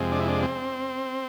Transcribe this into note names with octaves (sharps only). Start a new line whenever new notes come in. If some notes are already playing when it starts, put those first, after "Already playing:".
Already playing: F2 C3 G#3
D4
E4
D4
C4